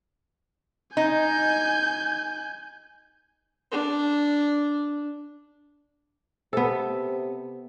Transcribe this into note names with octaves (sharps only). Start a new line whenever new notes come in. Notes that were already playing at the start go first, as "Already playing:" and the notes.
D#4 G#5 G6
D4
C3 B3 A4